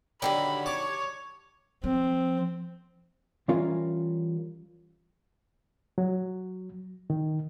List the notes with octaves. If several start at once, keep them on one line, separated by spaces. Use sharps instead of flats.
G2 D3 D#3 F#3 D5 G5 A#5 B5
C#5 A5 D6
F3 C4
E3 G3 C#4 F4 A#4 F5
F#3
D#3